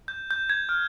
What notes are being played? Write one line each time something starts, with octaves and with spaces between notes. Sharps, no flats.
G6
G6
G#6
F6